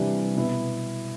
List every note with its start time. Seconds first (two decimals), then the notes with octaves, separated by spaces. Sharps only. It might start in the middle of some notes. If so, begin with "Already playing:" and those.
Already playing: C3 E3 G3 D4
0.36 B2 B3 E4